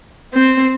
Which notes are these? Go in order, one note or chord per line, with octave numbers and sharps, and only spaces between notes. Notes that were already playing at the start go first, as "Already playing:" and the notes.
C4